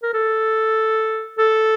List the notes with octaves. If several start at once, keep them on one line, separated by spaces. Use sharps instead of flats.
A#4
A4
A4